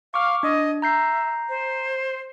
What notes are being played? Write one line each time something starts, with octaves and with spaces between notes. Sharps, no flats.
F5 C#6 D6 F6
D4 D#5
E5 A#5 G6 C7
C5